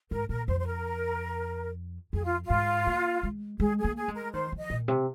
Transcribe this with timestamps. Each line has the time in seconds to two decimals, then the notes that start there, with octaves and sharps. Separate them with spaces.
0.11 G#2 A#4
0.29 A#2 A#4
0.48 F2 C5
0.59 C5
0.66 A#4
2.13 F2 G#4
2.24 F4
2.45 G#2 F4
2.87 A#3
3.23 G#3
3.60 G#3 G#4
3.78 G#4
3.84 A#3
3.97 G#4
4.08 G#3
4.15 A#4
4.34 D#3 C5
4.52 F3
4.58 D#5
4.70 A#2
4.88 C3